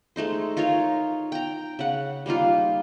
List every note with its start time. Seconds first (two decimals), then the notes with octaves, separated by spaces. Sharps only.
0.16 G#3 A3 D#4 C5
0.57 D#4 F4 A#4 C#5
1.32 G5 A#5
1.79 C#3 F#5
2.26 G3 A#3 D#4 F4